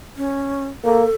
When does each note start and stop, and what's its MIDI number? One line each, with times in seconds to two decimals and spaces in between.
0.17 0.66 61
0.84 1.05 58
0.84 1.14 69